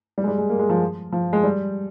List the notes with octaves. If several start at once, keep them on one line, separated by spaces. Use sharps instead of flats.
G3
G#3
G3
G#3
A#3
G#3
F3
F3
G#3
G3